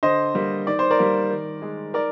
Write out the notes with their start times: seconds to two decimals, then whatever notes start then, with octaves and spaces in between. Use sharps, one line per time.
0.03 D3 C5 D#5
0.35 G3 A#3
0.67 D#3 D5
0.79 C5
0.91 A#4 D5
0.99 G3 A#3
1.31 D#3
1.62 G#3
1.94 D#3 A#4 D5